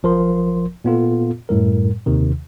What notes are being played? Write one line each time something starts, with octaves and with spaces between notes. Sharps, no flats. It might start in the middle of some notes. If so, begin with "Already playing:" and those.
G#1 F3 A#4 C6
A#2 B3 F4 A4
F#2 A2 G3 A#4
D#2 C3 D#3